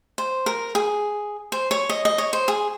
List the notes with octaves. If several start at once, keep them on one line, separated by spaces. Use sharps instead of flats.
C5
A#4
G#4
C5
C#5
D#5
D#5
C#5
C5
G#4